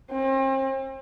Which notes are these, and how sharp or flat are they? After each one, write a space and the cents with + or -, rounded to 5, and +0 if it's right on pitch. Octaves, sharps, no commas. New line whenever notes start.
C4 +40